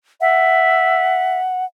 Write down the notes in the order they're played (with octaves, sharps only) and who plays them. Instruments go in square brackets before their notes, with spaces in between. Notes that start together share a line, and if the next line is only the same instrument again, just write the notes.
[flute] E5 [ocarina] F#5